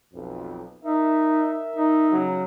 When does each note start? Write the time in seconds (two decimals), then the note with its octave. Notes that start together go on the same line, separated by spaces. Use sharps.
0.13 B1 F2
0.84 D#4 A#4 E5
1.76 D#4
2.12 C#3 F#3